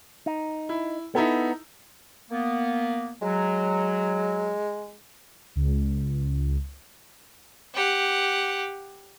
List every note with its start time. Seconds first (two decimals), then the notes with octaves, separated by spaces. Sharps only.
0.26 D#4
0.69 E4
1.15 B3 D#4 E4 A4
2.31 A#3 B3
3.22 F#3 G#3
5.56 C#2
7.74 G4 F#5